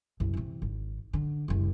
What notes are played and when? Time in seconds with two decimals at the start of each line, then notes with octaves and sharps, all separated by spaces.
0.20 C2 F#2
0.34 C3 E3
0.62 G#1
1.13 D3
1.48 F#1 C2